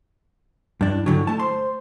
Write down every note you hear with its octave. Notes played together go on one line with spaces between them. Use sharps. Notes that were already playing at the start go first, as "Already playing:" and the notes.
G2 D4
E4
G2 D3 F#3
A3 A5
C5 C6